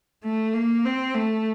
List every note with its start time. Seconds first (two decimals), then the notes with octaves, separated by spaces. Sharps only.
0.24 A3
0.54 A#3
0.85 C4
1.15 A3